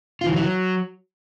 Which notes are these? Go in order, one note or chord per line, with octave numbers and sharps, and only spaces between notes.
F4
E3
F#3
E3
F#3